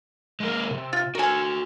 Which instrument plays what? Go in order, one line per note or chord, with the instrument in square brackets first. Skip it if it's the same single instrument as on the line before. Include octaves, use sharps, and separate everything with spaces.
[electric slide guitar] G#3 A#3 A#4
C3
[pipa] F4
[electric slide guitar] F#4 A4 [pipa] A#4 G#5